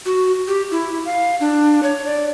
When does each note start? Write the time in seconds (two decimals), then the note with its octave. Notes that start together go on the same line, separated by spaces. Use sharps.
0.06 F#4
0.48 G4
0.71 E4
1.06 F5
1.40 D4
1.83 C#5
2.06 D5